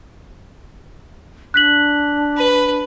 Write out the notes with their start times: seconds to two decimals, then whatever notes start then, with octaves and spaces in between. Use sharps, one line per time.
1.54 D4 F#6 B6 F#7
2.37 B4